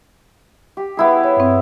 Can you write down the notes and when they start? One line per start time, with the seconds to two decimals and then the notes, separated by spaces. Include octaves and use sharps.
0.77 G4
0.97 B3 E4 G#4
1.24 C#5
1.37 G2 C4